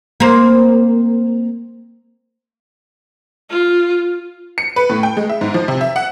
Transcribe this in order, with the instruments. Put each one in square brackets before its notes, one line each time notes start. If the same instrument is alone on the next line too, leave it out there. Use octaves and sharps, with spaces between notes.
[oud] A#3 C4
[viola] F4
[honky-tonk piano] C#7
B4
A2
G5
G#3
E5
G#2
F3
C3
E5
F#5